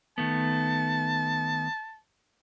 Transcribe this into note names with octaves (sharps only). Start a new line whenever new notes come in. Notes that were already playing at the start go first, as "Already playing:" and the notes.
D#3 A3 B3 A5